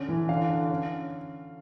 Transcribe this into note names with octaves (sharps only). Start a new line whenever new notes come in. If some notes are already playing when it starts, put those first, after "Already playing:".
Already playing: D3 C#4
E3
D3 F5
D3
C#4